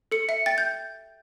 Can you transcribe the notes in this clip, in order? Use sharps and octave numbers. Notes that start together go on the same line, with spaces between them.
A4 C#7
E5 C#7
G5 A6
G6